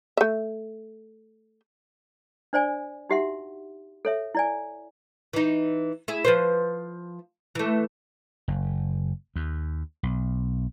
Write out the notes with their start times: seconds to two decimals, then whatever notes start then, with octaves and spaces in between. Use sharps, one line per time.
0.17 A3 E5
2.53 D4 C5 D5 G#5
3.09 D#4 F#4 G4 E5 F#5 C6
4.05 A4 C#5 E5
4.35 E4 D5 G#5
5.33 E3 D#4
6.08 E4 G#4
6.24 F3 B4 C5
7.55 E3 A3
8.48 F#1
9.36 D#2
10.03 B1